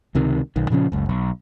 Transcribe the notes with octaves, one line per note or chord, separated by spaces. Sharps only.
C#2 C3 D#3
B1 D#3
A#2 C#3 F3 C#4
F#1 C#2
B1